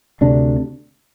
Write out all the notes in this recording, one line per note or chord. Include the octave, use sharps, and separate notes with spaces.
D2 C3 D4